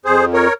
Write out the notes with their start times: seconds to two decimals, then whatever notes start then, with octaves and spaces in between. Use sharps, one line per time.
0.05 F2 G#4 C5
0.33 A#4 C#5